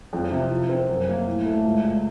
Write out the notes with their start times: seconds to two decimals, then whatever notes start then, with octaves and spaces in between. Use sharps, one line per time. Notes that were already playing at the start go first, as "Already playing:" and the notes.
0.13 F2
0.31 C3
0.51 F3
0.69 C4
0.89 F#2
1.08 A#3
1.27 A2
1.46 A3
1.64 C#2
1.84 C#2